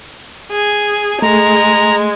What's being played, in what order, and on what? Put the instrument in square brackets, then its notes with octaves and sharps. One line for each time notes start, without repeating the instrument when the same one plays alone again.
[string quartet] G#4
[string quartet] G#3 [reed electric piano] A3 G#4 [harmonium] A#5